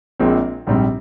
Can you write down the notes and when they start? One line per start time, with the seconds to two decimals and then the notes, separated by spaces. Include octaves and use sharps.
0.20 A#1 A#2 G#3 C4
0.67 A#1 G#2 G3 C4